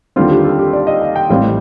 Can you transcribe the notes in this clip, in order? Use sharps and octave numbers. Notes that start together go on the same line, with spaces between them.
D#2 D3 G3 C4 F4
G4
A4
G4
D5
D#5
F5
G5
A1 A2 G3 C4 F5